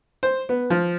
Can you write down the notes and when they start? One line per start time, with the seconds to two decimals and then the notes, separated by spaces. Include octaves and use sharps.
0.23 C5
0.49 B3
0.70 F3